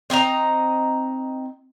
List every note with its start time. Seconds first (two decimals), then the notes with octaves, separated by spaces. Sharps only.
0.10 C4 D#4 D#5 A#5